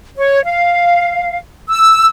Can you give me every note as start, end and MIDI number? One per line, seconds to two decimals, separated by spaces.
0.17 0.39 73
0.44 1.38 77
1.69 2.07 88